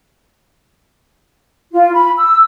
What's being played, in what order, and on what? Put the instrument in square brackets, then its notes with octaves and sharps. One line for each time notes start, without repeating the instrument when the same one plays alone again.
[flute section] F4
B5
E6